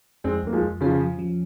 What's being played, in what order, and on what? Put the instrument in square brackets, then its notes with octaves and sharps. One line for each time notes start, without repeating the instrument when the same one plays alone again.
[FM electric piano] F2 [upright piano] G#3 C4
[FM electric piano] F2 [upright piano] A#3
[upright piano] F3 G#3
[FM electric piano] F2
[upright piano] C#3 F3 [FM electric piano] C#4
[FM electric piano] F3
F3